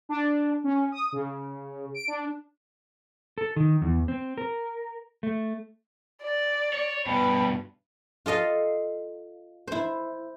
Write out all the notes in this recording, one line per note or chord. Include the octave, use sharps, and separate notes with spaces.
D4
C#4
D#6
C#3
D7
D4
A4
D#3
E2
C4
A#4
A3
D5
C#5
G2 B2 B4
F4 A4 D#5 F5
E4 C5